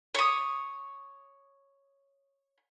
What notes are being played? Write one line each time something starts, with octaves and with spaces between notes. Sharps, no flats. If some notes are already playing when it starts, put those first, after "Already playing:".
C#5 D#6